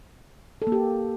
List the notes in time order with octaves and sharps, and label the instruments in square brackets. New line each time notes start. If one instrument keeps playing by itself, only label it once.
[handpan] A4
A#3
G4